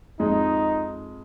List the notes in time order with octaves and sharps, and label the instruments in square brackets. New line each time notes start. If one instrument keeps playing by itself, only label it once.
[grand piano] F2 G#3 [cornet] D#4